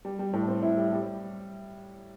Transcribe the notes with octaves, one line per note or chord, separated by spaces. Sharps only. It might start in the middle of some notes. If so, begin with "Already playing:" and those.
G3
G3
A2
C4
E4
G3
G3